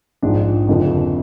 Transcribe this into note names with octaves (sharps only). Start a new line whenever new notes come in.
A#1 G#2 F3 D4
F#1 F2 D3 F3